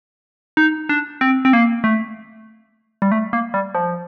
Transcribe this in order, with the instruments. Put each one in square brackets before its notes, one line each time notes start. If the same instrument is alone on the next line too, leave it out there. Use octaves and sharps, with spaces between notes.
[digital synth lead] D#4
D4
C4
C4
A#3
A3
G3
A3
A#3
G3
F3